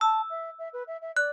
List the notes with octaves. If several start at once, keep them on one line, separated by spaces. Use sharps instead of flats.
A5 E6
E5
E5
B4
E5
E5
D5 F#6